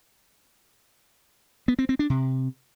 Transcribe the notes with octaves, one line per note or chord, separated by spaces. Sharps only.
B3
C4
C4
D4
C3